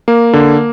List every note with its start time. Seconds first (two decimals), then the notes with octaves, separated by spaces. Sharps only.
0.08 A#3
0.33 D3